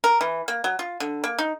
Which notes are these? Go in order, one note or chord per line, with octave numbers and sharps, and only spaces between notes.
A#4
E3
A#3
F#3
F4
D3
A#3
D#4